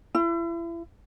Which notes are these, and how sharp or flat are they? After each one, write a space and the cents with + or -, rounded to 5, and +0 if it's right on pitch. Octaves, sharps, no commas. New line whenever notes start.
E4 +35